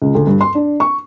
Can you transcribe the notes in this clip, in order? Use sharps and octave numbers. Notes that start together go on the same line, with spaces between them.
C#2
D2
G2
C6
D4
C#6